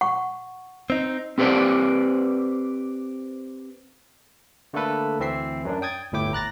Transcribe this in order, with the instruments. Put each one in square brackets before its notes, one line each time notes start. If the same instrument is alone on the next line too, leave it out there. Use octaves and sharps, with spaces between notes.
[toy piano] F#5 C#6
[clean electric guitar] C4 D#4
[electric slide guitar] C4 G4 B4 C5 D5
[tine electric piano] D3 A3 A#3 D4 A4 B4
D2 E3 C4 E5 C7
F#2 F#3 D4
G5 D#6 G#6 A6
G1 D2 A2 E4 G5 D6
A#5 F#6 A6 A#6